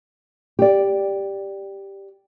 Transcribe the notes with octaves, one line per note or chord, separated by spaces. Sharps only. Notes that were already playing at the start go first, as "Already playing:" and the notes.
G4 D5